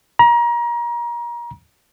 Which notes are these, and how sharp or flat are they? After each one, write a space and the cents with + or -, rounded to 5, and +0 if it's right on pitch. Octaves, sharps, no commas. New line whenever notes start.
A#5 +30